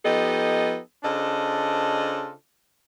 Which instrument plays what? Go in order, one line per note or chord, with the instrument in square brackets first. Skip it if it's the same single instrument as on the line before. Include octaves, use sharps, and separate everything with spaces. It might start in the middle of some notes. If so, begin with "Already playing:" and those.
[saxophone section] F3 B3 D#4 G4 A4 D#5
C#3 D4 F4 A4 C5 D#5